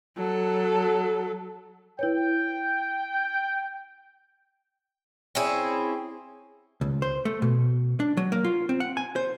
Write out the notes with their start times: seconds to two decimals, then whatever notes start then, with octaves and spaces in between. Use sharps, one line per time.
0.17 F#3 A4
1.99 E4 B4 C#5 G5
5.35 C4 C#4 E4 G#4
6.81 C#2
7.02 C5
7.25 A3
7.42 B2
8.00 D4
8.17 F#3
8.32 A#3
8.44 F4
8.69 C4
8.80 F#5
8.97 G#5
9.16 C5